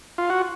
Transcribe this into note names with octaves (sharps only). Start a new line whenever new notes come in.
F4
F#4